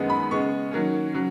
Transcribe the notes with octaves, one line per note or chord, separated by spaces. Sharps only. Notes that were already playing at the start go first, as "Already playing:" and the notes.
Already playing: F#2 D#3 G#3 B3 D#4
B5
C#3 G#3 B3 C#6
D#3 F#3 A#3 C#4
C#3 F#3